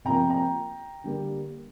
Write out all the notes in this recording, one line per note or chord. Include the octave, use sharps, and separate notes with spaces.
C3 F3 A#3 G5 A#5
G5 A#5
D3 G3 A#3